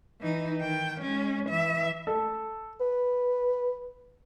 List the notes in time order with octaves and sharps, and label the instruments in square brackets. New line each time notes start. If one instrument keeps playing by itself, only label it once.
[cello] E3 D#4
D#3 G5
G#3 C#4
E3 E5
[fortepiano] A4
[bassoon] B4